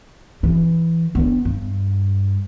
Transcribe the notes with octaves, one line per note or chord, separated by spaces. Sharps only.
E3
B3 D4
G2